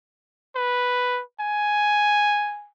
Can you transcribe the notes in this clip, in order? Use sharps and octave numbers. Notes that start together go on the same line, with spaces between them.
B4
G#5